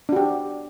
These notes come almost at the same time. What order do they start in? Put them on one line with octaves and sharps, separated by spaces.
D4 F#4 G4